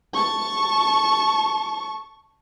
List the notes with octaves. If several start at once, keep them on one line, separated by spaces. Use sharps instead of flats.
A5 C#6